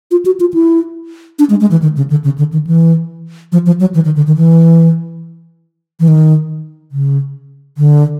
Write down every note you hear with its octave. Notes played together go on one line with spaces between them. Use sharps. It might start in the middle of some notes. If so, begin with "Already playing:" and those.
F4
F#4
F4
E4
D4
G#3
G#3
E3
D#3
C#3
D3
C#3
D3
D#3
E3
F3
F3
F#3
E3
D#3
D3
D#3
E3
E3
D#3
C#3
D3